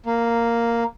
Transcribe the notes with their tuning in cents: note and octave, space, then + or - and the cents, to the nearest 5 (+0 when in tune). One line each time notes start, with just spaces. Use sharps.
A#3 -5